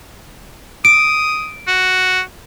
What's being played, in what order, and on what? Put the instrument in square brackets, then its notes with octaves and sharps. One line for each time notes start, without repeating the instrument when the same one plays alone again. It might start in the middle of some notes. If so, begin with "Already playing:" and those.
[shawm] D#6 [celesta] D7
[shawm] F#4